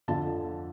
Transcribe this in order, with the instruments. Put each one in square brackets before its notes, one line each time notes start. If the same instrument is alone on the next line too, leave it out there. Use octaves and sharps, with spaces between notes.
[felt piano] F2 D3 F3 A5